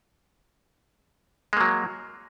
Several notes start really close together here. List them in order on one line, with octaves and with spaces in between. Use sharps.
G#3 A#3 F#3